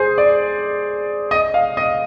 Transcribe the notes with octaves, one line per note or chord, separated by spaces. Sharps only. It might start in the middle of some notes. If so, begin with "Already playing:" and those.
Already playing: G#4 C5
D5
D#5
F5
D#5